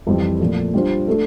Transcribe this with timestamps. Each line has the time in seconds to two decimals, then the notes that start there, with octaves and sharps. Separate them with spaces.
0.07 F2 E3 G3 C4 E4
0.40 A#2 F3 A3
0.74 G3 D4 F4 C5
1.07 A3 D4 A4